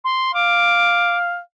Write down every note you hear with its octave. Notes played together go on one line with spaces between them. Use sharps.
C6
F5 D6